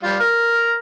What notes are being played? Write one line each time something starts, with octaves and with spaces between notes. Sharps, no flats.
G3 F4
A#4